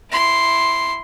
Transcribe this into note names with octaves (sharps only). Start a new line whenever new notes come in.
E4 C6